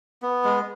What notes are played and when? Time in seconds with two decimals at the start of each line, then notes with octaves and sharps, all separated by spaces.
0.22 B3
0.44 G#3